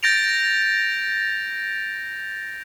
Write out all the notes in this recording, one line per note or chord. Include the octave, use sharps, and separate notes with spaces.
G6 A6 A#6 D7 F7